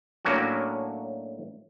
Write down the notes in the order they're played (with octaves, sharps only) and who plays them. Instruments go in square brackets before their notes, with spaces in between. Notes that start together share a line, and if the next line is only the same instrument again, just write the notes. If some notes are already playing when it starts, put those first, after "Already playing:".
[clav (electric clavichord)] A2 F#3 A#3 C#4 D4 F#4